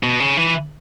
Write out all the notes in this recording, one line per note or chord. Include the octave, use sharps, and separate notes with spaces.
B2
C#3
E3